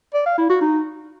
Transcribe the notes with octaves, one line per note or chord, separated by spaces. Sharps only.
D5
F5
E4
F#4
D#4